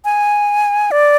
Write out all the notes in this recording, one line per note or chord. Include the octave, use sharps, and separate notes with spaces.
G#5
D5